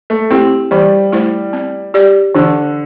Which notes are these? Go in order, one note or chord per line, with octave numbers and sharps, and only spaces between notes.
A3
A3 C4 E4 G4
E3 G3
A3 E4 C5
C4
G4 D5
D3 E3